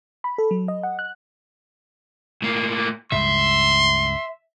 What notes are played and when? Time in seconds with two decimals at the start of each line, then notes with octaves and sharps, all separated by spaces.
0.24 B5
0.38 A4
0.51 F#3
0.68 D#5
0.83 F#5
0.99 F#6
2.42 A2 A#3
3.12 C#2 G2 C#3 E5 C6